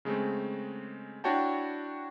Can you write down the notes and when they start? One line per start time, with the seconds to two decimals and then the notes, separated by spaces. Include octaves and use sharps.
0.05 C#3 G#3 A3 C4
1.24 D4 E4 F#4 C#5 G5 A5